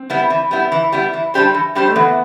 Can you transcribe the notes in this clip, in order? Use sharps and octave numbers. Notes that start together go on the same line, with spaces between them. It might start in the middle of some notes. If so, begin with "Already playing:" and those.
Already playing: C4
G3 B3 E4
E3
G3 B3 E4
E3
G3 B3 E4
E3
G3 D4 G4 C5
E3
G3 D4 G4 C5
A3
E3 B3